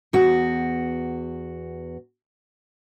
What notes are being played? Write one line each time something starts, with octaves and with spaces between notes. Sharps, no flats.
E2 F#4